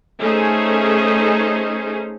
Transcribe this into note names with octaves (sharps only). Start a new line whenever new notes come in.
A3 C#4 D#4 G#4 C5